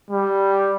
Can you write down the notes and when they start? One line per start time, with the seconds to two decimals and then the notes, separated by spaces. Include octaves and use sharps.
0.11 G3